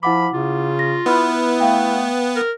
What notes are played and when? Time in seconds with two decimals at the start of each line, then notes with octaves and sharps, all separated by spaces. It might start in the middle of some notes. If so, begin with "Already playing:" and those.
0.03 F3 E4 F#5 B5 D6
0.34 C#3 F4
0.79 A#6
1.06 B3 E4 B4 B5 F6
1.60 A3 F5 G5
2.36 A#4